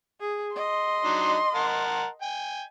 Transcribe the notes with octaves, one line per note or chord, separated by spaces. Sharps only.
G#4
D#5 C6
F#3 D4 D#4
A#4 F#5 A5
G5 G#5